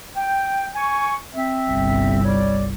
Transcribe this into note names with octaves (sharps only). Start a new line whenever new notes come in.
G5
G#5 C#6
C4 E5
G1 C2
G3 C#5 D5